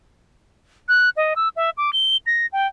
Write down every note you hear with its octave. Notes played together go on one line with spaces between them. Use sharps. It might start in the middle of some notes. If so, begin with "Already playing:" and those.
F#6
D#5
E6
E5
D6
G7
A#6
G5